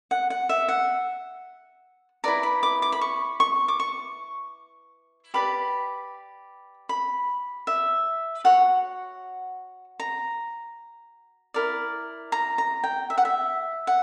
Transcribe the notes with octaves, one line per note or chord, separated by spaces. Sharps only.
F#5
F#5
E5
F#5
E4 B4 D5 A#5
B5
D6
D6
B5
C#6
C#6
D6
C#6
G4 B4 D5 B5
B5
E5
F#4 C#5 F#5
A#5
E4 A#4 D5
A#5
A#5
G5
E5
F#5
E5
F#5